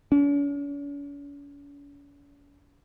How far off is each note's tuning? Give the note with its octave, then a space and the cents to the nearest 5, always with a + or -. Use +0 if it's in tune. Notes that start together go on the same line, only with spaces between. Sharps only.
C#4 +45